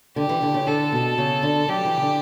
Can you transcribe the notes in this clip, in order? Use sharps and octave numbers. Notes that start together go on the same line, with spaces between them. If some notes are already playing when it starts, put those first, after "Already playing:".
D3 G4
E3
D3
C#3
D3 A4
B2
C#3
D3
F#3 G4
E3
C#3
D3